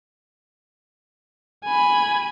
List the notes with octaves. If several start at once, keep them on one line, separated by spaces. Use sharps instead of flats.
G#5 B5